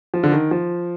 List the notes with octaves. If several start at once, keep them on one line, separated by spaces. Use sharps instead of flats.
F3
D3
D#3
F3